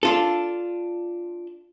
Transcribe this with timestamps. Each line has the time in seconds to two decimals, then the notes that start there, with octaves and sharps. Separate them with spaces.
0.03 D4 F4 A4